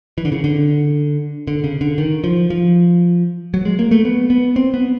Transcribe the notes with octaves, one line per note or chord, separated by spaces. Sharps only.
E3
D3
C#3
D3
D3
C#3
D3
D#3
F3
F3
F#3
G#3
A#3
A3
B3
B3
C4
B3